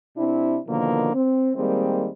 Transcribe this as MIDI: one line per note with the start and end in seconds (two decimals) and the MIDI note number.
0.17 0.57 48
0.17 0.57 60
0.17 0.57 62
0.17 0.57 64
0.67 1.11 47
0.67 1.11 50
0.67 1.11 51
0.67 1.11 53
0.67 1.11 58
1.13 1.51 60
1.56 2.09 51
1.56 2.09 55
1.56 2.09 56
1.56 2.09 58
1.56 2.09 60